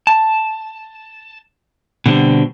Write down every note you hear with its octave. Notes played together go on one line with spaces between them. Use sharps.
A5
B2 D3 G3 C4